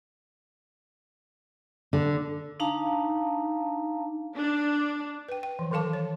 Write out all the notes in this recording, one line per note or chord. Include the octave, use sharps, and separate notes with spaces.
D3
D4 D#4 F5 A5 A#5
D4
B4 G5
G5
E3 F3
D#3 F#3 A4 F5 A5 D6
C#5